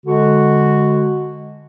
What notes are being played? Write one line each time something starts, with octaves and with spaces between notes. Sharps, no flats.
D3 G#3 F#4